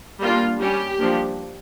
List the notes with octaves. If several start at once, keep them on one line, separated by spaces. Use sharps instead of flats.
G3 A#3 D4 F4
G3 C#4 G4
F3 A#3 D4